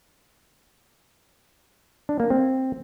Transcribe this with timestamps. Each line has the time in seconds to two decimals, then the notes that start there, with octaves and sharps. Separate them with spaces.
2.09 D4
2.20 A#3
2.30 C4